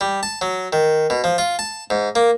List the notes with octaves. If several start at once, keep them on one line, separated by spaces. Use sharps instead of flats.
G3
A5
F#3
D#3
B2
F3
F4
A5
G#2
A#3